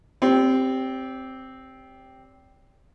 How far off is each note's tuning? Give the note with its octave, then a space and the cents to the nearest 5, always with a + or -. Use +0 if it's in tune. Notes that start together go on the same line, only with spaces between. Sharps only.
C4 +0 G4 +0 D5 -45